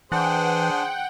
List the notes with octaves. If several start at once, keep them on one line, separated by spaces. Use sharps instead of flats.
E3 D4 G#4 C5 F#5 G5